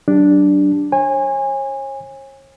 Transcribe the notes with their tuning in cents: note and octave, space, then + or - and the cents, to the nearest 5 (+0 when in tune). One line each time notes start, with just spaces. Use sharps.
F#3 +35 D4 +0 G4 +25
C#5 -40 G#5 -20